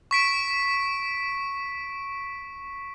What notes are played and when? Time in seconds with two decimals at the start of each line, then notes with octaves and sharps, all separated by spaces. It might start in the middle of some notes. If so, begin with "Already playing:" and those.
0.11 C#6 B6 D7